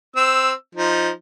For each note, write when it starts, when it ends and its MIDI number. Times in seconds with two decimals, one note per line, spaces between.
0.16 0.52 60
0.16 0.52 88
0.75 1.09 53
0.75 1.09 63